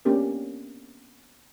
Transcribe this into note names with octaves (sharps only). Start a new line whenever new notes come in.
A#3 B3 C#4 D4 G4 A#4